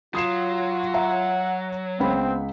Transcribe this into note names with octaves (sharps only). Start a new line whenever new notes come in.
F#3 F4 D#6 C7 E7
E5 F#5 A#5
C#2 B3 C4 B5